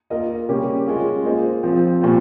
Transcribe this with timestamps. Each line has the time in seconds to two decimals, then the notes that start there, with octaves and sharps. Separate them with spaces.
0.10 A#3 F4 A#4 D#5
0.49 C#3 G3 A#3 C#4 G4
0.86 G#3 C#4 F4 G#4
1.25 A#3 F4 G#4 C5 D#5
1.63 F3 C4 F4
2.01 A#2 G3 C4 F4 C5